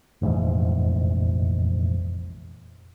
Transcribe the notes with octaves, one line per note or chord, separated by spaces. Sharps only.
F1 A#1 E2 G#2